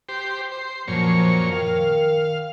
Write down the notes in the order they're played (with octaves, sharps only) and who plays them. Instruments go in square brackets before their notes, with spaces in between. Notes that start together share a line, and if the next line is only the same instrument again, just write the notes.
[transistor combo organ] G4 C5
C5
[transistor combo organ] F#2 A#2 C#5 [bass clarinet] F3
[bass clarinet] D#3 [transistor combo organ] F5